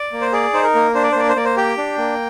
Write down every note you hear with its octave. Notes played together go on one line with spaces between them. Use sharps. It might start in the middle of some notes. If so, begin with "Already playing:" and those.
Already playing: D5
A#3
C5
G#4 D5
D#4 C5
A#4
A#3
D4 C5
D5
C5
A#3 D5
C5
A#3 D5
C5
G4 G5
D4
A#3